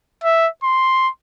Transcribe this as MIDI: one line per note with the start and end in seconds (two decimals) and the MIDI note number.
0.24 0.48 76
0.64 1.09 84